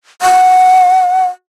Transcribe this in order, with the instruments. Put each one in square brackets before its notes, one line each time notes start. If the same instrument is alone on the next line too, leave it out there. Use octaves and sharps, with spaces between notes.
[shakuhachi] F#5